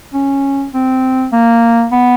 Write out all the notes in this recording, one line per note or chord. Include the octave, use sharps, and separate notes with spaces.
C#4
C4
A#3
B3